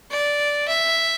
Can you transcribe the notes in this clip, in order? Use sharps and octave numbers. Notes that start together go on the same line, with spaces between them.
D5
E5